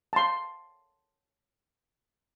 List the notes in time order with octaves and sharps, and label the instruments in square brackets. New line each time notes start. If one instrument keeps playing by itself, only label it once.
[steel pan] A5 C6